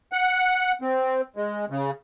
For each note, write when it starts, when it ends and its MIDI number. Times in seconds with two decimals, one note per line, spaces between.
0.12 0.72 78
0.82 1.21 60
1.36 1.65 56
1.70 1.91 49